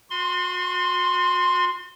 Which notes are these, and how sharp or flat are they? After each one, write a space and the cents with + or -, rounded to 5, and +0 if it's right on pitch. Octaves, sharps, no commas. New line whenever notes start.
F#4 -35 C6 +0